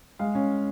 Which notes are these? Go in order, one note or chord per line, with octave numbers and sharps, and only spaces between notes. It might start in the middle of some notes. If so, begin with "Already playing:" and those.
G#3 F5
C#4